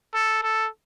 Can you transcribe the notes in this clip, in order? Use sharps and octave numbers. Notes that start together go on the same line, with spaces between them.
A4
A4